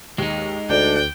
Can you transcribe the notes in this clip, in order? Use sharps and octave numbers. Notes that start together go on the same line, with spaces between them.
D#2 G#3 D#4
D2 D4 G5